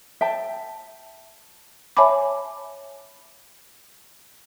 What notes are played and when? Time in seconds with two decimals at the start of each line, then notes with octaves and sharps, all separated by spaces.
0.21 E5 G5 A5
1.97 C#5 E5 G#5 A5 B5 D6